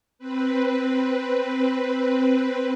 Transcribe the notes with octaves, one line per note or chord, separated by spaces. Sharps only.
C4 B4